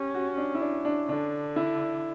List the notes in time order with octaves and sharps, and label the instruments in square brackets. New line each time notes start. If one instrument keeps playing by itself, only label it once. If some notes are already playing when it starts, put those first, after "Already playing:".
Already playing: [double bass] C#4 [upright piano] G4
[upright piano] F#4
D4
E4
D4
D4
[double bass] D3 [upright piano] D4
[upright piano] E4